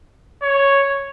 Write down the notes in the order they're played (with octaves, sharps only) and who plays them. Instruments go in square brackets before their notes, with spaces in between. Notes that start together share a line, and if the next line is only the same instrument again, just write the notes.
[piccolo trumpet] C#5